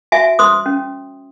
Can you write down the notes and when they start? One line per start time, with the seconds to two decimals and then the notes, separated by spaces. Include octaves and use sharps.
0.12 F#4 E5 G#5
0.39 C5 C6 D#6
0.66 C#4